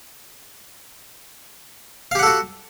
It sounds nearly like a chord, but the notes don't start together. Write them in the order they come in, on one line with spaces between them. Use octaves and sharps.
F5 G4 F#5 A4 F#4